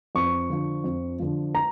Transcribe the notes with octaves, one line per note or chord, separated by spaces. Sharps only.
F2 C#6
D3 F3
F2
D3 F3
A#5